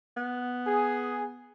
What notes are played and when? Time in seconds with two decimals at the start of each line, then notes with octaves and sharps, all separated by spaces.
0.17 B3
0.67 G#4